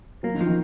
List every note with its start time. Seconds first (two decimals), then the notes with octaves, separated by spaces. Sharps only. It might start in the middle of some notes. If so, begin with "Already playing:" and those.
0.23 F#3 A#3
0.34 D#3
0.41 F3
0.46 D#3